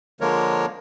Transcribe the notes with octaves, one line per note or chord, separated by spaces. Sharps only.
D3 F3 G#3 A#3 A#4 C#5